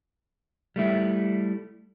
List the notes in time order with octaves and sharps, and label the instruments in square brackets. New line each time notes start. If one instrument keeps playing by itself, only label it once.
[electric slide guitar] G3 A3 E4